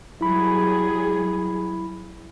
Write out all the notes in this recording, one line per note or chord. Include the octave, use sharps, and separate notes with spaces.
F#3 G3 E4 G#4 B5